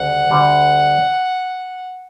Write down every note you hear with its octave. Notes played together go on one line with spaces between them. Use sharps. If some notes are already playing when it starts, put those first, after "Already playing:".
Already playing: D2 C#3 G3 F#5
D2 D3 G3